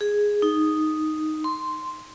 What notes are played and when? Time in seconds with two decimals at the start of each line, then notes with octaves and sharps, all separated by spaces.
0.01 G#4
0.42 D#4
1.44 C6